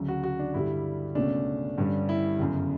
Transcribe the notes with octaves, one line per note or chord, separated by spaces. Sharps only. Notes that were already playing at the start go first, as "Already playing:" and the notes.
Already playing: D2 C#3 F#3
F#4
F#4
D4
G2 D3 G3 E4
C#2 B2 A3 C#4 D4
G2 D3 G3 C#4
E4
G1 F#2 C#3